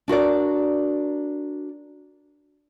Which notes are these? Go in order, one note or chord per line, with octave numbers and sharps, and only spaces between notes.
D4 F#4 A#4 D5